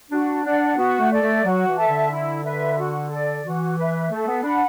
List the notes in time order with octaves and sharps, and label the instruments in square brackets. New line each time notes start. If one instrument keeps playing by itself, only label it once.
[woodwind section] D4 [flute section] F#4
[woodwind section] D4 [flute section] D5 F#5
[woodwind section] B3 [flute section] F#4
[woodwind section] A3
[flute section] A4 D5
[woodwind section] A3
[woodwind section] F#3 [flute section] F#4
[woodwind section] E3
[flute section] A4 E5 A5
[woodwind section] D3
[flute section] E4
B4 E5
F#4
A4 D5
[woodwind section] E3 [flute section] F#4
[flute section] B4 E5
[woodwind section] A3 [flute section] A4
[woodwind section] B3
[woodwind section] D4 [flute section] F#5 B5